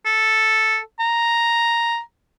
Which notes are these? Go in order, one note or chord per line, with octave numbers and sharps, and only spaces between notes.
A4
A#5